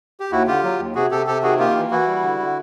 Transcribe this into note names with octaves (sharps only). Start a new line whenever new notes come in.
G4
D#2 E4 F#4
D3 F4 G4
F#3
D#2
C3 F#4 G#4
C3 G4 A4
C3 G4 A4
D#3 F#4 G#4
A#3 F4 G4
E3
E3 E4 F#4
G3
D3
D3